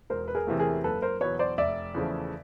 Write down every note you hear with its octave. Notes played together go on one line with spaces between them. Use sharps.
E1 A#4 C5
B4
G#4 A#4
E2 C3 E3 A3
G#4 A#4
F#1 A4 B4
A#4 C5
E2 B2 F#3 B4 C#5
C5 D5
F1 D5 E5
E2 C#3 F3 A3